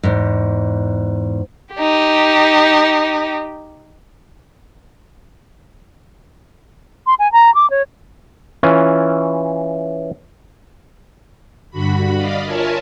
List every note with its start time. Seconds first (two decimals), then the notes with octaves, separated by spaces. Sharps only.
0.03 E2 G#2
1.75 D#4 G4
7.07 C6
7.19 G#5
7.32 A#5
7.55 D6
7.70 C#5
8.63 E3 C#4 F4
11.70 G2 D3 F#4 B5
12.15 D5 D#5 F5 B5
12.45 F4 A#4 C#5 E5 G#5 A5